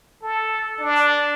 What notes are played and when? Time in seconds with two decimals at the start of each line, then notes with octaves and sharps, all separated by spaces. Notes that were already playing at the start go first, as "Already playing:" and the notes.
0.22 A4
0.79 D4